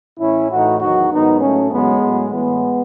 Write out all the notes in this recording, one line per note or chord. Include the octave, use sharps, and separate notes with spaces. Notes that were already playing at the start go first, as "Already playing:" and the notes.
A2 E3 C#4 E4
A2 E3 D#4 F#4
E2 D#3 F#3 D#4 F#4
G#2 D#3 F#3 B3 D#4
A2 F#3 A3 C#4
E2 C#3 F#3 G#3 B3
A2 F#3
A2 E3 G#3 B3